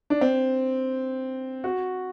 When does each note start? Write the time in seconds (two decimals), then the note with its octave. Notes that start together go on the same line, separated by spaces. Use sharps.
0.10 D4
0.21 C4
1.64 F#4